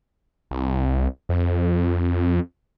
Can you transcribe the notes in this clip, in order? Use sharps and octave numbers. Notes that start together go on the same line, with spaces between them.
C2
F2